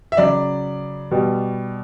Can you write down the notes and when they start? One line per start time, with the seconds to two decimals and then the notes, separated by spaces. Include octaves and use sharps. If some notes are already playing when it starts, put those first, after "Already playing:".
0.12 E5
0.17 C#3 F#3 D5
1.11 B2 G3